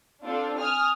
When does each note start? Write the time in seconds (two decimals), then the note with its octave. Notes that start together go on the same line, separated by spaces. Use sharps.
0.22 C4 D4 F4 A4
0.59 G#5 D#6 F6